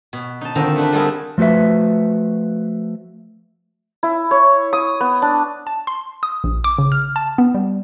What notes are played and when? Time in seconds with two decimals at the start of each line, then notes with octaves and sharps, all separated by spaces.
0.13 B2
0.41 D#4 A5
0.55 D3 D#3 F3 C4 A#5
0.76 A3 D4 B4
0.93 G3 A3 B3 C4 G#4 A#4
1.38 F3 A3 F#4 B4 E5
4.03 E4
4.31 C#5
4.73 D#6
5.00 B3
5.22 D4
5.67 A5
5.87 C6
6.23 D#6
6.44 A#1
6.64 D6
6.78 C#3
6.92 F6
7.16 A5
7.38 B3
7.55 G3